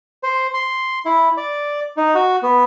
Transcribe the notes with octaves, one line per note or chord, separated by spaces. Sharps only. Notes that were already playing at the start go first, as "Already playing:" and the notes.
C5
C6
E4
D5
D#4
F#4
B3